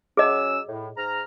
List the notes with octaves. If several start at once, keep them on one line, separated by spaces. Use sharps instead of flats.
F#3 C#4 G#4 D#5 E6
A2
G#2 A#5 F6